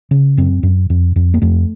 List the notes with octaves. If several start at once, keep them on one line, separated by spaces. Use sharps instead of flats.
C#3
F#2 C4
F#2
F2
F2
A#3
F2 A3